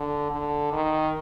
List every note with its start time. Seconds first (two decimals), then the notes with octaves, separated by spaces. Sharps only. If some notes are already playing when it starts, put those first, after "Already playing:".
Already playing: D3
0.31 D3
0.72 D#3